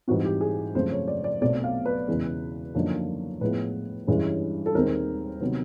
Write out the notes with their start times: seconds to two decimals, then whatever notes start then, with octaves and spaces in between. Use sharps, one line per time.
0.07 G#2 E3 G3 C4 F#4
0.25 G4
0.41 G#4
0.75 F#2 C#3 F3 A3 C4 C5
0.91 C#5
1.08 D5
1.24 D5
1.41 B1 B2 F#3 A3 C4 D5
1.64 F5
1.86 B4
2.08 E2 C#3 E3 G#3
2.75 F#2 D3 F3 A#3 D#4
3.41 A2 F3 G#3 B3 E4 B4
4.07 G2 E3 G#3 C#4 E4
4.66 A4
4.75 D#2 D#3 G#3 C4 A#4
5.41 C3 D#3 F#3 B3